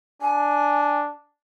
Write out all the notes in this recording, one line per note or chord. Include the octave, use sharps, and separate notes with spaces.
D4 G#5